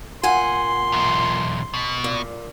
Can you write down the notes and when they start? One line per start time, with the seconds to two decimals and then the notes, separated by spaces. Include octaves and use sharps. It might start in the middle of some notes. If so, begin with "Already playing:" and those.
0.23 A#2 F#5 G#5 C6
0.92 B1 E2
1.74 B2
2.04 A#2